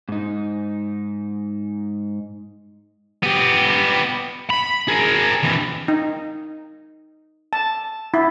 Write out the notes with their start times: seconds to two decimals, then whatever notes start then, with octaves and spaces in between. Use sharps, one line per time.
0.09 G#2 D#4
3.23 B3 G4
4.50 B5
4.88 G#4 A#4
5.43 G2 E3
5.88 D#4
7.53 A5
8.14 E4